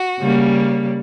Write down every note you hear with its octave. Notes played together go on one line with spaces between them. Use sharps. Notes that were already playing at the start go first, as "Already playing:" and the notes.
Already playing: F#4
C#3 G3 A#3